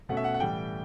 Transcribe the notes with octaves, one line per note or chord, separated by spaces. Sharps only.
B2 A3 C#4 F#5
E5
F#5
F#5
A2 E3 G3 G5